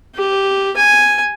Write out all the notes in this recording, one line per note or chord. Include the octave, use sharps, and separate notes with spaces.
G4
G#5